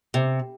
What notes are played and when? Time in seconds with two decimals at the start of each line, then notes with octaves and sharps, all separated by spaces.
0.14 C3